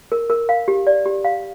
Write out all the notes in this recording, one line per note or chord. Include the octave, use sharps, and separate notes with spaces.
A#4
A#4
F5
G4
D5
G4
F5